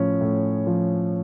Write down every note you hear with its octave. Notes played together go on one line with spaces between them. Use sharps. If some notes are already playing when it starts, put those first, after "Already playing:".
Already playing: A2 F3 C#4
A2
F3 C#4